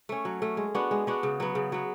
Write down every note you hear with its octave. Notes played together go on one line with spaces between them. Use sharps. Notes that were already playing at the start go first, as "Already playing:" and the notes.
A3 C#4
F#3
A3 C#4
G#3
B3 D4 F#4
G#3
B3 D4 F#4
C#3
F#3 B3
C#3
F#3 B3